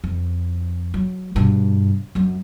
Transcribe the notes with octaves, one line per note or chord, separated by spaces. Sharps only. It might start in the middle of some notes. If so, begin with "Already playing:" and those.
F2
F#3
G2 B2
F#2 F#3